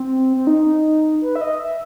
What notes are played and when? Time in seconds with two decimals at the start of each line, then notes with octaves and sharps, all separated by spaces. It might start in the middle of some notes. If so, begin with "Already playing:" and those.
Already playing: C4
0.37 C4
0.47 D#4
1.22 B4
1.36 E5
1.41 D#5
1.60 E5